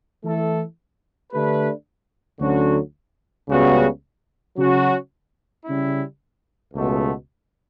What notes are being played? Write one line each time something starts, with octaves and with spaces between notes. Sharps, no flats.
E3 A3 E4 A4
D3 A3 D4 G4 B4
D2 D3 F#3 C#4 F#4
C#2 C#3 G3 B3 F#4
C#3 F#3 C#4 F#4
C#3 G3 C#4 E4
C#2 B2 A3